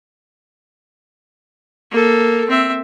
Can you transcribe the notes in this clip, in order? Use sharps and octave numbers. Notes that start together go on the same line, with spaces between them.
A#3 A4
C4 E5